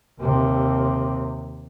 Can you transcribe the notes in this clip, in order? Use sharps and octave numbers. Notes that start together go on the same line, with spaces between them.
D#2 C3